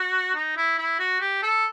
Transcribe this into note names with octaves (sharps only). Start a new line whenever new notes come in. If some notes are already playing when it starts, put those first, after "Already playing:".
Already playing: F#4
D#4
E4
E4
F#4
G4
A4